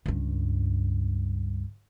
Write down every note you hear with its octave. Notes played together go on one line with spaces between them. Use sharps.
C#2 G2